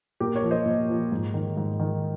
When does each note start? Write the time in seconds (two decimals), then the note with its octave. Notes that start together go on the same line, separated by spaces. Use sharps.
0.20 A#2 G4 A#4
0.35 A#4 C#5
0.43 F3
0.51 C5 D#5
0.66 A#2
0.89 F3
1.12 G#2
1.34 D#3
1.57 G#2
1.80 D#3